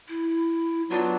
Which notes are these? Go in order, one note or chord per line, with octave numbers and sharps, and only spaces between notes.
E4
F#3 B3 D4 F4